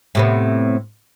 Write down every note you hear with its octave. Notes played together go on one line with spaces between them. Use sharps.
A2 C3 B3